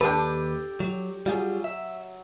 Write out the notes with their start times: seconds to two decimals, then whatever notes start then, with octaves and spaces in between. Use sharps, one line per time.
0.01 D#2 D4 G4 A4 B4 G5
0.80 F#3
1.26 F#3 G3 F4 G#4
1.64 E5